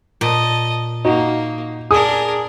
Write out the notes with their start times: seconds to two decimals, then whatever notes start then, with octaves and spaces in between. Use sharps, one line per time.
0.21 A#2 D#5 A5
1.05 A#3 D#4 F#4
1.91 D4 G#4 A#4 D#6